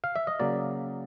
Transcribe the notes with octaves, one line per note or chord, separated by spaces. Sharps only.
F5
E5
D#5
C#3 F#3 A#3 D5